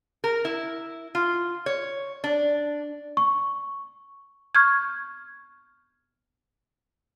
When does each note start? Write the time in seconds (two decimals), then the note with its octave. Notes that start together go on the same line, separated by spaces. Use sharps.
0.24 A#4
0.45 E4
1.15 F4
1.66 C#5
2.24 D4
3.17 C#6
4.55 C#6 F6 G6 G#6